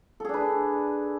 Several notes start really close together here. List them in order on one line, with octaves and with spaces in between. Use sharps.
A4 G#4 D4 B4